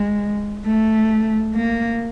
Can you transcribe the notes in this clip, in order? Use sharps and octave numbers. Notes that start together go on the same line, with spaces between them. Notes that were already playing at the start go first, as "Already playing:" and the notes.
Already playing: G#3
A3
A#3